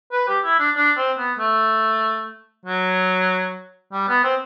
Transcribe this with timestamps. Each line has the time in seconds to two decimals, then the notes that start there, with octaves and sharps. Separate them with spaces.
0.12 B4
0.28 G4
0.44 E4
0.59 D4
0.76 D4
0.97 C4
1.17 B3
1.38 A3
2.65 F#3
3.92 G3
4.08 B3
4.23 C4